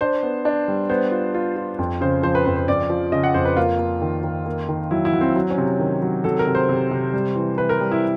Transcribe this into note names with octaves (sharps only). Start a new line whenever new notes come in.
D4 C5
B3
D4
G3
B3 C5
F4
F4
F4
F2
C#3 C5
F3 C5
B4
F2 B4
C5
F2 D5
F3
C#3 D#5
F#5
F2 C5
B4
A#3 F4
A#3
D#3
D#3
A#3
D#3
F#3 E4
E4
F#3
C4
F#3
C#4
C3
D#3
F#3
F#3 A4
A#4
C3
C5
C3
C3
G3
E3
E3 B4
A#4
G3
E4